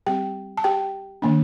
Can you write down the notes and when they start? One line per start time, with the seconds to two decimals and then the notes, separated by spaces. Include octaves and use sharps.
0.06 G3 C4 G4 G5
0.57 A5
0.64 G4 G5
1.22 D#3 A#3 D4